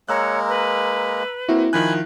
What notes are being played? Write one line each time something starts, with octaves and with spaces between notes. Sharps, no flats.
G#3 A#3 C#5 A#5 E6 F#6
B4
A#3 C4 E4 F#4
D#3 F3 G#5 B5 F#6